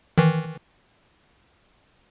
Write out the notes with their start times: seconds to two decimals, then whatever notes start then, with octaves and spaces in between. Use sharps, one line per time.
0.18 D#3 E3